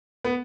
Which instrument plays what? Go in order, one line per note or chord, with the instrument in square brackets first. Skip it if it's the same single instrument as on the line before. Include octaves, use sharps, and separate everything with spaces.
[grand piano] B3